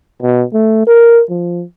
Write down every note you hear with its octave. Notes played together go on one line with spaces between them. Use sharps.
B2
A3
A#4
F3